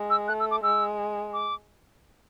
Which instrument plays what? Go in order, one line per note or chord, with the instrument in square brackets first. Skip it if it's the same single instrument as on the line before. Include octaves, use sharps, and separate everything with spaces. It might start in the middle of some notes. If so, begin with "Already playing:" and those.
Already playing: [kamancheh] G#3
[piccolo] E6
[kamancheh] A3 [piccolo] F#6
[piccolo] E6
D6
[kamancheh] G#3 [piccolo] E6
[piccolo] D6